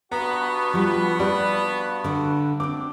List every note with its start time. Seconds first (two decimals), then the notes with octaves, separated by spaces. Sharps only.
0.12 G2 B3 F#4 A#5
0.74 F3 G3
1.20 G3 D5
2.04 D3 D4
2.60 C4 D4 D6